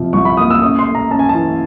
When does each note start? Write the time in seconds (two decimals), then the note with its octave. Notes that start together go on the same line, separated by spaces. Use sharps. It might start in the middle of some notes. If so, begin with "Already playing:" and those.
Already playing: F2 C3 F3
0.13 C2 C#6
0.25 B5
0.37 A#3 D#6
0.50 E6
0.62 C#4 D#6
0.79 C6
0.86 A3
0.95 A#5
1.11 C#4 A5
1.19 G#5
1.29 A5
1.35 E3